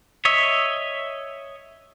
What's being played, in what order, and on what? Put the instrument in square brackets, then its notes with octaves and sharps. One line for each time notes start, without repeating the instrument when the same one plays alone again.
[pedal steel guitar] C#5 D#5 E5